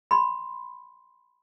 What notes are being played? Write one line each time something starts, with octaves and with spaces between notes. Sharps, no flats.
B5 C6